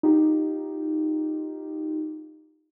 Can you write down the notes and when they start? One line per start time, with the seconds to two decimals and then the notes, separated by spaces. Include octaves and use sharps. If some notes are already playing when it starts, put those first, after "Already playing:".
0.03 D#4 F4 G4